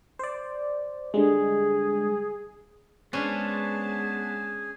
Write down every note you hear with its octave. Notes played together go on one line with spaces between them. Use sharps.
C5 D5
D3 G3 G#3 G#4
G#3 B3 C#4 D4 G#4 B4 C5 A5